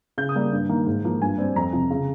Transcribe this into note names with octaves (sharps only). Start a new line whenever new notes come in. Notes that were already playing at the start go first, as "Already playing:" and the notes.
C#3 G6
D#6
G3 A#3
G2
D#3 A#3
G#2
F3 A#3
G2 G#5
G3 C4
F2 A#5
C3 F3
C#3